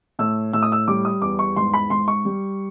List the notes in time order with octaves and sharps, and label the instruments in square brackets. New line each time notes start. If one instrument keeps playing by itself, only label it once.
[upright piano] A2 E6
A2 E6
D#6
E6
G3 D6
D#6
E2 D6
C#6
G#2 C6
B5
G#2 C6
C#6
G3